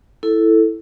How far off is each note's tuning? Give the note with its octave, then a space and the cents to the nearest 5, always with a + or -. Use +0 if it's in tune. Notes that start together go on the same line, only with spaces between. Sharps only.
E4 +0 A4 +0